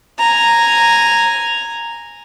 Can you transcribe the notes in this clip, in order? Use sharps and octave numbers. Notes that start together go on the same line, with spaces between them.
G#5 A#5